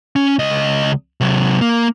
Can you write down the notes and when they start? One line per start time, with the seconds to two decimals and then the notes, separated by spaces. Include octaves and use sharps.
0.16 C#4
0.39 C#2 D#5
1.21 C3 F#3
1.61 A#3